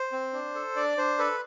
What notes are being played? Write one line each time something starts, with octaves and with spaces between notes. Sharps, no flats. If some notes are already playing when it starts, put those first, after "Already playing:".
Already playing: C5
C4
D4
A4
D4 D5
D4 C5
A4 B4